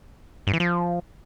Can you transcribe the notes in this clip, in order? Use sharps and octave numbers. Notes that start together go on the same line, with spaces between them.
G2
E3
F3